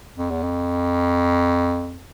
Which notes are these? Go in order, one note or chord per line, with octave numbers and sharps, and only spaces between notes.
F2
E2
F2